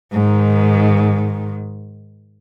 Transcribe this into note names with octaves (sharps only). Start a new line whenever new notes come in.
G#2 D#3